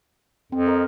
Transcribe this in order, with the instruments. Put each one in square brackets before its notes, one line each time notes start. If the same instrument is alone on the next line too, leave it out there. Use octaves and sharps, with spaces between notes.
[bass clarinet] F2 [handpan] C4
[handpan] A#4 D#5